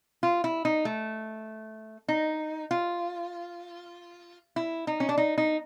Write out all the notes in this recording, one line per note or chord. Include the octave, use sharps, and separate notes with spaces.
F4
E4
D#4
A3
D#4
F4
E4
D#4
C#4
D4
D#4
D#4